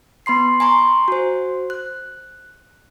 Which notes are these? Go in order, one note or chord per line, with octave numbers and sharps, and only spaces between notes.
B3 B5 C6 C7
G#5 A#5 C6 C#6
F#4 C5
F#6